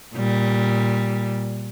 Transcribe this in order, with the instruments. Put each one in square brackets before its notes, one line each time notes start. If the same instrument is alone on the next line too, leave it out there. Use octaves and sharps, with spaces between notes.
[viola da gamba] A#2 G3